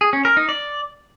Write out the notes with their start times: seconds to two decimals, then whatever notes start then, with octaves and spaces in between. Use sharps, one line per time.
0.01 G#4
0.13 C#4
0.25 A#4
0.37 D#4
0.49 D5